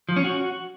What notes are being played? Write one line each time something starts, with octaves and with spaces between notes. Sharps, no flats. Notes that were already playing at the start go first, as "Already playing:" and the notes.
F3
C#4
F#4